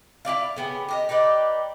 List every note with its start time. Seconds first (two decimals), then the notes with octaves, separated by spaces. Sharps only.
0.25 E4 G4 D5 F5
0.56 C#3 B3 G4 G#4
0.89 G4 A#4 D#5
1.09 D#4 G4 B4 D5